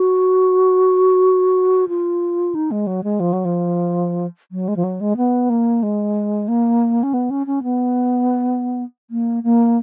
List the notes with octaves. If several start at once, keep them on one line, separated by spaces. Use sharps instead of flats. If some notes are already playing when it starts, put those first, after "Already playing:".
Already playing: F#4
F4
D#4
G#3
F#3
G#3
F3
F#3
F3
F#3
G#3
F3
F#3
G#3
B3
A#3
G#3
A#3
C#4
B3
C#4
C#4
B3
A#3
A#3